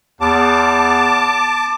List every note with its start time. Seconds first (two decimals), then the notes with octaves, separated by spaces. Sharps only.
0.21 E2 A5 D6